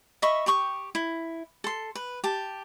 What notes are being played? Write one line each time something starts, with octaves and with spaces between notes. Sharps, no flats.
D#5 E5 B5 C#6
G4 G5 C#6 D#6
E4
A4 C6
B4
G4 A5